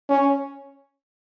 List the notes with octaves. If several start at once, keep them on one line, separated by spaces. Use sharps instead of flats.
C#4